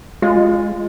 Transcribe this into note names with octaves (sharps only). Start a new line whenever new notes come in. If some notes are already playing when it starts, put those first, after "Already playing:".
G#3 F4